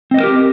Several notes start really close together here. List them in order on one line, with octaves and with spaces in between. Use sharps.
C4 D#5 B3 A#4 G4